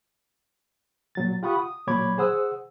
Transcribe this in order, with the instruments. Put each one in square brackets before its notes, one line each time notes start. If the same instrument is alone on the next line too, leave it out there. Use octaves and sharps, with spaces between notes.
[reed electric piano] A#2 F#3 A6
F4 G4 F#5 B5 C#6 D#6
D#6
A#2 F#3 C#5 B5 D6 G#6
G#4 C5 F#5 D#6 E6